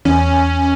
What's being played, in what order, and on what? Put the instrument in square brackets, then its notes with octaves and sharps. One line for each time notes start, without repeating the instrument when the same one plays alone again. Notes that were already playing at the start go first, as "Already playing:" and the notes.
[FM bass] E2 [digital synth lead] C#4